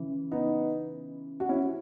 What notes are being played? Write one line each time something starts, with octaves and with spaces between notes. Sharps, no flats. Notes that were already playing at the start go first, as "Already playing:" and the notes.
Already playing: C#3 E3
B3 D#4
F#4
C#4 E4